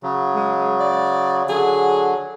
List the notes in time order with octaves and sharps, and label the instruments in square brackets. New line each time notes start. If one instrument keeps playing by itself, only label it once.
[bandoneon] C#3 F#3
[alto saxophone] G#3
D5
[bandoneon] D3 F#3 [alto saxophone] G#4